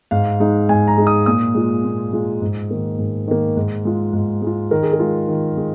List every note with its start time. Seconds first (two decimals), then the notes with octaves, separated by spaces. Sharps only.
0.11 G#2 F5
0.40 G#3 D#4
0.69 G#2 G#5
0.88 A#5
0.98 G#3 D#4
1.07 D#6
1.26 A#2 D#6
1.55 G#3 F4
1.84 A#2
2.13 G#3 F4
2.42 G#2
2.71 D#3 A#3
2.99 G#2
3.28 D#3 A#3
3.57 G#2
3.85 G#3 F4
4.13 G#2
4.42 G#3 F4
4.71 D#3 A#4
4.83 G#4
4.93 A#4
5.00 G#3 F4
5.28 D#3
5.57 G#3